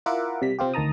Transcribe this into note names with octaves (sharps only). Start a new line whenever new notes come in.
E4 F4 A#4 E5 F#5 D6
C3 G3 B6
C3 C4 F4 G4
D2 D#3 A5 A#5 D#6